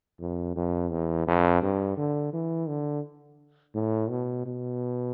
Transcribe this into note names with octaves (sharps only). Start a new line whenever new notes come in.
F2
F2
E2
F2
G2
D3
E3
D3
A2
B2
B2